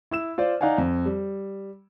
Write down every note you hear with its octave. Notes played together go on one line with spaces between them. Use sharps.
E4 E6 E7
F4 C5 D5
D#4 D5 F5 F#5 G#5
F2
G3